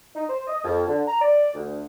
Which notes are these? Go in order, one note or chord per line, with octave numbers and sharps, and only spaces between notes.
D#4
C5
D#5
F2
D3
A#5
D5
D2